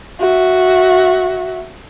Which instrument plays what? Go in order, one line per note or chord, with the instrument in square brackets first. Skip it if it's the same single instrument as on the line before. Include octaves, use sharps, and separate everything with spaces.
[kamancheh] F#4 E5